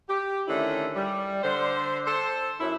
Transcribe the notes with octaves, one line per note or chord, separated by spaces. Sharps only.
G4
D3 D#3 A3 C#4 E4
G3
D3 C5
A4 C5
F#2 E4